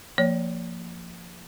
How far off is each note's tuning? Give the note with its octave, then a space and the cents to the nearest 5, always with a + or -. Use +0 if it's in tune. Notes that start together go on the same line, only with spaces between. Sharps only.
F3 +0 A#3 -15 C#5 +0